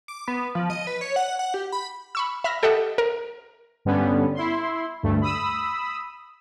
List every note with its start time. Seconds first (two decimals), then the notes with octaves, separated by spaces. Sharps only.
0.08 D6
0.28 B3
0.55 F3
0.70 D#5
0.87 B4
1.01 C#5
1.16 F#5
1.39 F#5
1.54 G4
1.72 B5
2.15 B5 C#6 E6
2.44 E5 B5 F6 A#6
2.63 G4 A4 D#5 E5 F#5
2.98 A#4
3.85 G2 D3 G3 B3 C#4
4.35 E4 C6
5.03 D2 G2 A3
5.21 B5 D#6 E6